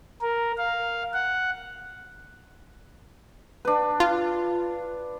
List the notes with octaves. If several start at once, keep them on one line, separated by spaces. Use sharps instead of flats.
A#4
F5
F#5
D4 B4
F4